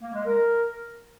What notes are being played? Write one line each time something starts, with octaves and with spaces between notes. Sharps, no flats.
A#3
G#3
A#4